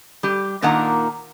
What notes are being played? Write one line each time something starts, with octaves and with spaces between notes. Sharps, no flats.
G3 G4
A#2 D#3 A#3 D4 F#5 A#5